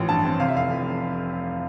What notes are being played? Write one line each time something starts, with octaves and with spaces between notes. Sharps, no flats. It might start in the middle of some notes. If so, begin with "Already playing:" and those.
Already playing: A1 F3
G2 A5
C4
C3 F5
E5
F1 F5
F2